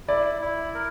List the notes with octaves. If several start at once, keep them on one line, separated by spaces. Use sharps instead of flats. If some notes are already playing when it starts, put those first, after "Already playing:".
E4 D5
E4
A#4